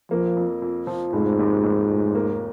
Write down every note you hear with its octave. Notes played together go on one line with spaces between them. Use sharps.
F3 A#3
F2
F2
F3
F1 G#2
D#2
D#2
F1
A#3